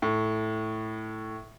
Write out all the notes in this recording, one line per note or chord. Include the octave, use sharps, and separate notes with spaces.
A2